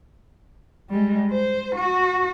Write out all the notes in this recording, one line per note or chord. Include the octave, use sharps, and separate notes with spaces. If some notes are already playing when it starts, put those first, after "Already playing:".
G3 G#3
C5
F#4